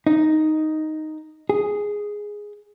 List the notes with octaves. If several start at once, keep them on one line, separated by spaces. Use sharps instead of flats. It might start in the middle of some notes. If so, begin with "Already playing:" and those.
D#4
G#4